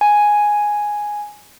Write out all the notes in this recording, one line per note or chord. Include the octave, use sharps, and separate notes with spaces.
G#5